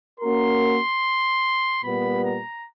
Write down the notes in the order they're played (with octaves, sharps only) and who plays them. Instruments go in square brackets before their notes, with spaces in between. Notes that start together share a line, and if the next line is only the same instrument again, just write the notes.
[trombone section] A#3 C#4 F#4 A#4 [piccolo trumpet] C6
[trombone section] A#2 G3 B3 [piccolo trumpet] B5
[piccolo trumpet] A#5